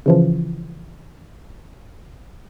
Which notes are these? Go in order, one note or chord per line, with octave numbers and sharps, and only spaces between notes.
C#3 E3 F3